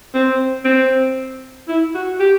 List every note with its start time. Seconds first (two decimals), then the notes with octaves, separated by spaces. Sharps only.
0.14 C4
0.65 C4
1.68 E4
1.95 F#4
2.20 G4